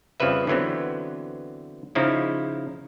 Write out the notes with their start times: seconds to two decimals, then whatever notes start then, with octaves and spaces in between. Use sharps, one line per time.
0.20 F2 C#3 F3 G3 B4 E5
0.47 D3 E3 F#3 B3 C4
1.95 C#3 F3 D#4 E4